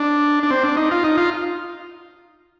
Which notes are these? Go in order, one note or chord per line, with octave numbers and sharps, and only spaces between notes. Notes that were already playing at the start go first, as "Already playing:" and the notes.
Already playing: D4
D4
C4
D4
D#4
F4
D#4
F4